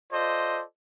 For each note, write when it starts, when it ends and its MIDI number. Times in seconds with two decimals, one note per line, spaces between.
0.12 0.63 65
0.12 0.63 69
0.12 0.63 72
0.12 0.63 74
0.12 0.63 75